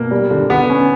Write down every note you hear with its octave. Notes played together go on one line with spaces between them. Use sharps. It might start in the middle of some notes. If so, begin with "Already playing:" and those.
Already playing: B2 A#3
G3
D3
D3 B3
C#4